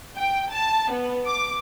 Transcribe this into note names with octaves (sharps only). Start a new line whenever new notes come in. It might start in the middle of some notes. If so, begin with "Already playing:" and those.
G5
A5
B3
D6